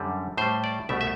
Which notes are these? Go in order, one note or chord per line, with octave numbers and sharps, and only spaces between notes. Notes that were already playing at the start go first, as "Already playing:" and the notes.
Already playing: F#2 D3 G3
A2 G3 C5
D5
C2 B2 A3 E5
E5